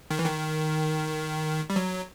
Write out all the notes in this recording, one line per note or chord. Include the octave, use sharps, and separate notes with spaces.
D#3
E3
D#3
G3
F#3